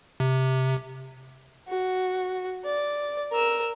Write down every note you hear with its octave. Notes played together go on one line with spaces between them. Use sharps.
C3
F#4
D5
A#4 E6